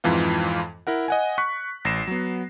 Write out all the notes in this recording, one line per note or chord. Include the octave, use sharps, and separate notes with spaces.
F2 G#2 E3 F4 F5
E4 A#4 F#5
D#5 F#5 G#5
C#6 F#6 B6
A1 A#6 C7 E7
F#3 B3